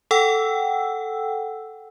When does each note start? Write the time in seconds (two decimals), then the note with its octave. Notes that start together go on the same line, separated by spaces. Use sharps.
0.11 A4 F#5 G5 E6